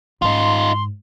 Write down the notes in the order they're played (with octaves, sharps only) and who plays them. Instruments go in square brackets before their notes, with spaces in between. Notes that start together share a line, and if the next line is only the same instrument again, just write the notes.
[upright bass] G#2 [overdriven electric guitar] D#4 F4 [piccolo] C6